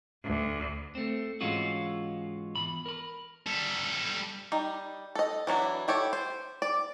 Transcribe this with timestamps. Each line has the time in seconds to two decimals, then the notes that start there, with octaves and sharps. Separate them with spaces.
0.24 D2
0.95 A3 C4
1.41 G#2 E3 G#3 C#4 F4 F#4
2.56 E2 G#2 B5
2.86 A#4 B5
3.47 G3 A4
4.52 G3 D#4
5.15 A4 D#5
5.47 E3 F#3 D4 E4
5.88 E4 G4 A4 C#5
6.13 C5
6.62 D5